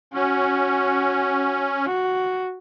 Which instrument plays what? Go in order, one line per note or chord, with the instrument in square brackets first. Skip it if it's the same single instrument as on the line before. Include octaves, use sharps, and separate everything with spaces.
[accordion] C#4 [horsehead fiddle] F#4
[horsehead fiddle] F#4